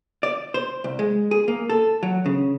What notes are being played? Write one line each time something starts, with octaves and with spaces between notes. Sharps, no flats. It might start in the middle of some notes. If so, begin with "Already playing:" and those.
D5
C5
C2
G#3
G#4
A#3
A4
F#3
C#3